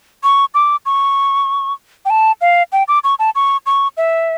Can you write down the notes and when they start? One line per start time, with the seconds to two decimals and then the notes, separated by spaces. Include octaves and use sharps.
0.23 C#6
0.54 D6
0.86 C#6
2.05 G5
2.10 A5
2.41 F5
2.72 G5
2.88 D6
3.04 C#6
3.19 A5
3.35 C#6
3.66 C#6
3.97 E5